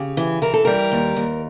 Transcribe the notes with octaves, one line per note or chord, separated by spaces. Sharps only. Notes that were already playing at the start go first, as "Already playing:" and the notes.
Already playing: C#3 G4
E3
E3 A#4
A4
G3 A#4
D#2
D#2